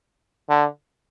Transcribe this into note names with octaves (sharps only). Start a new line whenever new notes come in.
D3